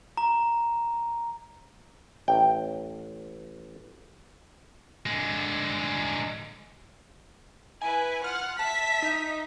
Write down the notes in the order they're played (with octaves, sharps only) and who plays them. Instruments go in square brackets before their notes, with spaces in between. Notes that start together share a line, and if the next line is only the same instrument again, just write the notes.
[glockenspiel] A#5
[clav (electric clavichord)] A1 G5
[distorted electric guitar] D3 G#3
[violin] E4 B4 [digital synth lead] G#5
[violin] F4 F#5 [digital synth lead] F6
[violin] E5 B6 [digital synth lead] A5
[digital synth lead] D#4